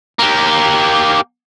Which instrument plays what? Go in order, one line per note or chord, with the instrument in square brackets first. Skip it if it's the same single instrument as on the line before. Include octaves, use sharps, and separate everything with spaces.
[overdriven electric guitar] A#3 G4